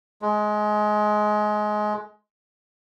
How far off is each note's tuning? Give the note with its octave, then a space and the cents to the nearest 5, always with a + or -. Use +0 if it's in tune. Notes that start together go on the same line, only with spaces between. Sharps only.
G#3 +20